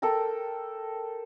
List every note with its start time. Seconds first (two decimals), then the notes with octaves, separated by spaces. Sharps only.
0.02 A4 A#4 G5 A#5